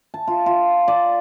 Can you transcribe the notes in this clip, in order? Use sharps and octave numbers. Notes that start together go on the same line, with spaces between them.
A5
F4
F4
D5